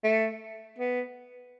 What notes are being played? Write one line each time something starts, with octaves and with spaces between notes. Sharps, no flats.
A3
B3